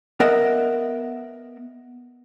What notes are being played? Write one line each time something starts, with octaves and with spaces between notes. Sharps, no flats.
B3 A#4 D#5 E5 F#5